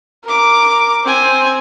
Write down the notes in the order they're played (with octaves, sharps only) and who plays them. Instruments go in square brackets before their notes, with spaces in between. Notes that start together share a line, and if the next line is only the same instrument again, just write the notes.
[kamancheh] A#4 D6
C4 G#5